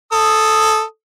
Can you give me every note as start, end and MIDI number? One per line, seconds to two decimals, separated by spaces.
0.12 0.82 69
0.12 0.82 87